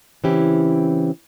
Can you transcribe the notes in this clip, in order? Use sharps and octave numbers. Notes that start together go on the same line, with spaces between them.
C#3 E3 C4 C#4 E4 G4